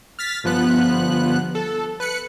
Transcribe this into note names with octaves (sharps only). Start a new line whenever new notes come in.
F6 A6 B6
G1 F3 B3 F#6
A4
B4 F#6 C#7